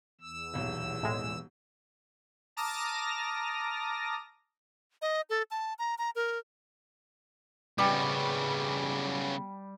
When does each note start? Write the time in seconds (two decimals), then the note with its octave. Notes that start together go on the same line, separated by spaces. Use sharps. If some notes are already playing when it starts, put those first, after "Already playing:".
0.21 E2 E6
0.53 D#1 B1
1.03 A2 G#3
2.57 A5 A#5 D6 D#6 F6 A#6
5.02 D#5
5.30 A4
5.51 A5
5.79 A#5
5.98 A#5
6.16 A#4
7.78 C#3 G3 B3